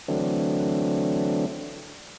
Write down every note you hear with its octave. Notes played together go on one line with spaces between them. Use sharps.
D3 E3 F#3 A3 C4 D4